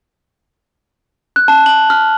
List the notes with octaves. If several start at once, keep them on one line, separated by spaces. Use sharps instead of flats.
F#6
A5
F#7
F6